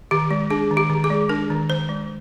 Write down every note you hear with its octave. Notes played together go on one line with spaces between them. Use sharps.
D#3 G4
G#3
D4 G#4
D#3
G4
D#3
G#4
G#3
D4 A#4
D#3
D#3 C5
G#3